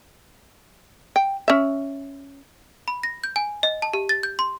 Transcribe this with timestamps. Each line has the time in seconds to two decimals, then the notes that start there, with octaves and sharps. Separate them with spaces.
1.16 G5
1.48 C#4 E5
2.88 B5
3.03 A#6
3.24 G6
3.36 G#5
3.63 D#5
3.82 A5
3.93 G4
4.09 A6
4.23 G6
4.39 C6